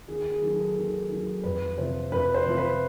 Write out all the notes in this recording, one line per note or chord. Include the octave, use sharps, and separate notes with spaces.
D#2 G#4
G#4
D#3 F#3
A4
D#2
D#3 F#3
F2 B4
C3 F3 C5
F2 B4
C5
C3 F3
B4